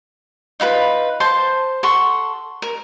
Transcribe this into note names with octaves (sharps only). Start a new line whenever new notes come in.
D#4 F4 B4 B5
C5 A5 C6
A4 F#5 C6 C#6
A#4